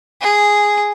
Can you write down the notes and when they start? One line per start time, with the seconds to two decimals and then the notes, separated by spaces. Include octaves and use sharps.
0.22 G#4